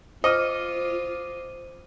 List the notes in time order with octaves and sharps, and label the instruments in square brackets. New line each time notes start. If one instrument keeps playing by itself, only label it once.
[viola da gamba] F4 [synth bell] C5 D6 D#7 [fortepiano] D#5 F6